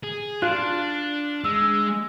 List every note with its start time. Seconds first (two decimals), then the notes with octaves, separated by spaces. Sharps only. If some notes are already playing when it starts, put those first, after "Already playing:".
0.03 G#4
0.42 D4 F4 F#6
1.44 G#3 E6